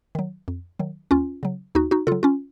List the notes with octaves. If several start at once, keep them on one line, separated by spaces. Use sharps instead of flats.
D#3 F#3
F2
D#3 F#3
D#2 C#4 F4
C#3 F#3
D#2 D#4 F#4
D#4 F#4
C#3 F#3 F4 A4
C#4 F4